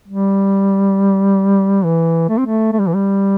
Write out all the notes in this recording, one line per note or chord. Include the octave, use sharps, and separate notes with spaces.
G3
E3
A3
C4
A3
A3
G3
E3
G3